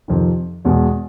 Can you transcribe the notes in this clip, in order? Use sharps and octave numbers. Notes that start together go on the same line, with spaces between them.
F2 C3 D#3
E2 B2 G#3